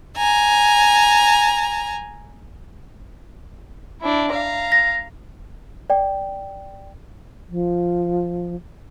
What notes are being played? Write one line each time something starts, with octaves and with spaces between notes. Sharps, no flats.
G#5 A#5
D4 E4
F5 A#5
A#6
D5 G5
F3